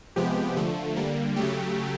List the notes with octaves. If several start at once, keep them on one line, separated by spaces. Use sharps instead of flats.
C3 F3 G#3 B3 G4
D3 F3 A3
D3 G3 A#3
C#3 F#3 A3 G4